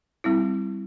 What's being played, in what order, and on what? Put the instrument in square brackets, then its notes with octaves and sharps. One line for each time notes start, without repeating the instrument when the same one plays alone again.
[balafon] G3 C4 E4